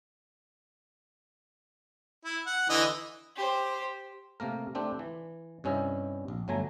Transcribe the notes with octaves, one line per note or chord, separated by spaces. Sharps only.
E4
F#5
D3 E3 D#5
G4 C5
C3 A3 A#3 A#4
A3 C4 D4 G4
E3
G2 C3 C#4 E4 D#5
A#1
G1 F#3 A3 G#5 A#5